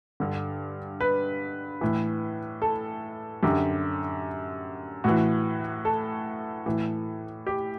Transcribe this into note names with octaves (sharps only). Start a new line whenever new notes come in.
G2 D3
B4
A2 E3
A4
F#2 D3 G4
A2 E3 F#4
A4
A2 E3
G4